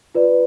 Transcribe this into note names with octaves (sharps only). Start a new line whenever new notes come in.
F4 B4 D5